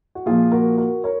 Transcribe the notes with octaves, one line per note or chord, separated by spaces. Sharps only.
F#4
A#2 F3 F4 G#4
F#4 A#4
F#4 A#4
A#4 C#5